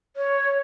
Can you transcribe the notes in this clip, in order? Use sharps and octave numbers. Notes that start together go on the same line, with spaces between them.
C#5